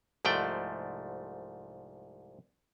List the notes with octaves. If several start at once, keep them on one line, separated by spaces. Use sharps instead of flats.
C2 G#2 F3 A3 D5 G5